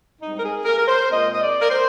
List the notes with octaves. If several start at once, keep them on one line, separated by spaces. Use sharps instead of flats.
G#2 G3 C4 D#4
A#4
G#4
A#4
A#4
C5
A#2 G#3 C4 D#5
D#5
D5
A#4
C5